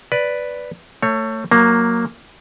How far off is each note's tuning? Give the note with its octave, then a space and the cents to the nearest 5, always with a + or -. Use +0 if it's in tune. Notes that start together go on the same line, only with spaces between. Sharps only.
B4 +0 D5 -5
A3 +25 C#5 -5
F#3 -5 A#3 +0